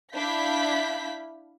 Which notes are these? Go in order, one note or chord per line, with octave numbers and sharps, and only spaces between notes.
D4 E4 F5 B5 G6 B6